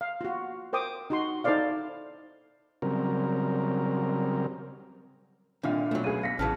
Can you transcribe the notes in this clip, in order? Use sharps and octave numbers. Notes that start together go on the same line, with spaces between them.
F5
F4 F#4
A#4 C5 G5 D6 D#6
D#4 F#4 C6
D#4 E4 A4 C5 D5 F5
C#3 F#3 G3 C4 A#4
C2 A#2 D3 D#3 D4 E5 F5
B2 F#3 A3
C#2 G#4 D#7
B1 F5 A#6 B6 C#7
A1 C#3 E3 F#3 A5 F6